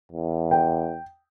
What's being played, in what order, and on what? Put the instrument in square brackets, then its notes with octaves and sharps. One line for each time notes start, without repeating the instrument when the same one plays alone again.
[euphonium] E2
[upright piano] G5